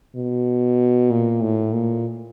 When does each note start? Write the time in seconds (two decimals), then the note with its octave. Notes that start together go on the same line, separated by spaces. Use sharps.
0.16 B2
1.10 A#2
1.42 A2
1.73 A#2